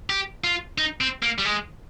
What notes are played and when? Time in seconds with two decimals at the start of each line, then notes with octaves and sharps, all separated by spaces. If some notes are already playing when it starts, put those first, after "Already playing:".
0.10 G4
0.44 F4
0.78 D#4
1.01 C4
1.23 A#3
1.39 G3
1.45 G#3